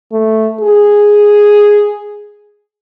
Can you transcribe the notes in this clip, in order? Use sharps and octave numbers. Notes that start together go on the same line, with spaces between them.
A3
G#4